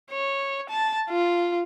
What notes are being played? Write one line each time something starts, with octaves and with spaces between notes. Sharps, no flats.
C#5
A5
F4